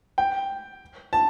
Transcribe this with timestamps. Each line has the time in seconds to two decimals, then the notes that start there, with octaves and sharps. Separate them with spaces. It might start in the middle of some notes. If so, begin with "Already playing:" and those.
0.18 G5
1.13 A5